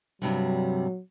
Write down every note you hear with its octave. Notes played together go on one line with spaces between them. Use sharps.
G2 C3 F#3 G3